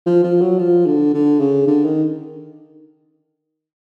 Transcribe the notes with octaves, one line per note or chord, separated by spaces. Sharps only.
F3
F3
F#3
F3
D3
D3
C#3
D3
D#3